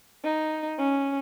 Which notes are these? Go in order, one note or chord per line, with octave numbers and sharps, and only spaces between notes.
D#4
C#4